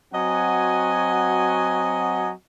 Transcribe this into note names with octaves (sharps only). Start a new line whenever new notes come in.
F#3 C4 F#4 D#5 F#5 G#5